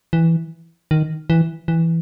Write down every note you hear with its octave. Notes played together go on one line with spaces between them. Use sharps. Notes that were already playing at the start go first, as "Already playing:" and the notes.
E3
D#3
E3
E3